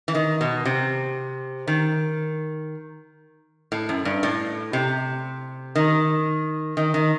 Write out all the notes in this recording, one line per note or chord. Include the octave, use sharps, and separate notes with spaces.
E3
D#3
B2
C3
D#3
A2
F#2
G2
A2
C3
D#3
D#3
D#3